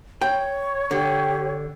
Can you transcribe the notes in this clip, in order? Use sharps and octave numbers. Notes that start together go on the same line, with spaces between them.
C#5 G5
D3 G4